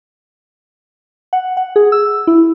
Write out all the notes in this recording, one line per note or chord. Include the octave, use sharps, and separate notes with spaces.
F#5
F#5
G#4
E6
E4